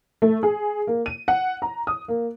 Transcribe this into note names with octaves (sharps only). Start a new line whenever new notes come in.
A3
G#4
A#3
D#7
F#5
A#5
D#6
A#3